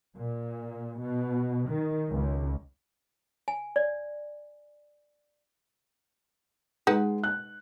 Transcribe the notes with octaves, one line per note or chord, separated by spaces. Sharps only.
A#2
B2
D#3
C#2
G#5
D5
G#3 D#4 B4 F#5
F#6